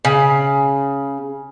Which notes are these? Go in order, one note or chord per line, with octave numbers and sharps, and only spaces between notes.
C#3